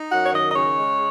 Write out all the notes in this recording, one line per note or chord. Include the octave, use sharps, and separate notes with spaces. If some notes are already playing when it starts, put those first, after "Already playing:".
Already playing: D#4
F#2 F#5
C#5
D#3 D#5
D#5
C#3 C#5
G#3